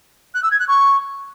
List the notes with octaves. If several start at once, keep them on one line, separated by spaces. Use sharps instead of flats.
F#6
E6
G#6
F#6
C#6